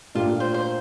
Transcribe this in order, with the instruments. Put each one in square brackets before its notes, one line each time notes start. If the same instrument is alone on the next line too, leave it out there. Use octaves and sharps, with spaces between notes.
[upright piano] A#2 A3 D4 G4 A#4 [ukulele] F4
[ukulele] C5
C5